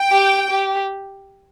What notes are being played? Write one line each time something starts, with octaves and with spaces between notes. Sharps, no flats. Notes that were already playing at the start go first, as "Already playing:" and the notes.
Already playing: G5
G4
G4